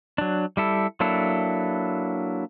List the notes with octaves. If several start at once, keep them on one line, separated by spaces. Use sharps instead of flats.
F#3 D4
G3 E4 A4
F#3 A#3 D4 E4 A4